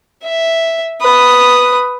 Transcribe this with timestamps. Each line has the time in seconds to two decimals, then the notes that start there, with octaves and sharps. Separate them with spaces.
0.24 E5
1.01 B4 D#6